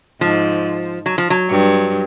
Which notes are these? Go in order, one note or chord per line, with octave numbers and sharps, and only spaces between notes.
G#2 F3
F#3
F3
F#3
G2